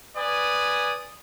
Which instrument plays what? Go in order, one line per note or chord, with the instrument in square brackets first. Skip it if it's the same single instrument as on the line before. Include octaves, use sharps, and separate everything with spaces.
[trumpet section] B4 D5 G#5 D#6